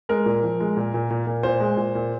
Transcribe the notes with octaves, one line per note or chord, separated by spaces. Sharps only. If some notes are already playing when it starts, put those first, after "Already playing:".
G#3 A#4
A#2
F3
G#3
A#2
A#2
A#2
A#2
A#2 C5
G#3
A#2
A#2